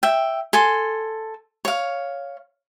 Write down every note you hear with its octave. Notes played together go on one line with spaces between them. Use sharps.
E5 G5
A4 G#5 C6
C#5 F5